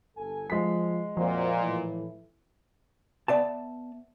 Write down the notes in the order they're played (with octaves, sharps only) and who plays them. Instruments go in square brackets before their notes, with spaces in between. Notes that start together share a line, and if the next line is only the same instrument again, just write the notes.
[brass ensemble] G1 A4 G#5
[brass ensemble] F3 [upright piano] G#3 B6
[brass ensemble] F2 F#4 C5 [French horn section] A#2 [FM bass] F3
[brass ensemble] A2 E3
[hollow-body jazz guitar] B3 D5 E5 A5